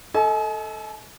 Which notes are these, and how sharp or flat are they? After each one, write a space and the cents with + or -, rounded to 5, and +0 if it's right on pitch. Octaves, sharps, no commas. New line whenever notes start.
A4 +0 D#5 +30 G#5 +40